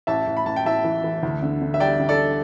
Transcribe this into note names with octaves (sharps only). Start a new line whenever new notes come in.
A1 E5 A5
A1
B5
A1 A5
G5
A1 E5 A5
E3
E3
D2
D3
D3
E5
G3 D5 G5
D3
A4 D5